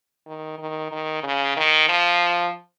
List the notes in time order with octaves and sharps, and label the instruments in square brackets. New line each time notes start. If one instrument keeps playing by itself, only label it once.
[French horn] D#3
D#3
D#3
C#3
D#3
F3